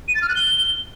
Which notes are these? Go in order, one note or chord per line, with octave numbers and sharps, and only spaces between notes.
D#7
A6
F6
F#6
G7